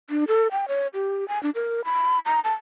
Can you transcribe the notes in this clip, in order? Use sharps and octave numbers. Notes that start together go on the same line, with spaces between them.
D4
A4
G5
C#5
G4
G#5
D4
A#4
B5
A#5
A5